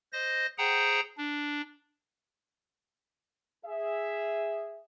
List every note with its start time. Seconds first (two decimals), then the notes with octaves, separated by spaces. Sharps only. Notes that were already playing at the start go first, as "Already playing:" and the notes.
0.13 C5 D#5 A#6
0.58 G#4 C5 F#5 G5 A#5
1.18 D4
3.65 G#4 E5